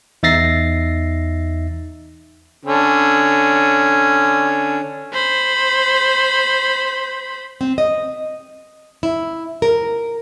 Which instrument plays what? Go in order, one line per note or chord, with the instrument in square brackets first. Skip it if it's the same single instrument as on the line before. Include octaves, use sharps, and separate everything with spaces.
[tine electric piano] E2 D#4 E5 A6 A#6 C7
[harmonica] D3 C#4
[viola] C5 B5
[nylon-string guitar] C4
D#5
E4
A#4